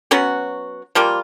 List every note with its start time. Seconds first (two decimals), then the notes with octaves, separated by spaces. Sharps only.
0.11 F#3 B3 C#4 F#4
0.95 F3 G3 A#3 F4